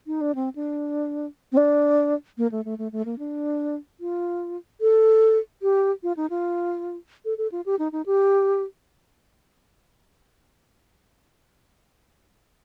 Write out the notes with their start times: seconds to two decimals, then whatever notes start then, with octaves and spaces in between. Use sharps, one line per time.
0.07 D#4
0.21 D4
0.35 C4
0.56 D4
1.52 C4
1.57 D4
2.38 A#3
2.52 A3
2.65 A3
2.78 A3
2.92 A3
3.05 A#3
3.19 D4
4.00 F4
4.81 A4
5.62 G4
6.03 F4
6.17 D#4
6.30 F4
7.25 A4
7.38 A4
7.52 F4
7.66 G4
7.79 D#4
7.92 D#4
8.06 G4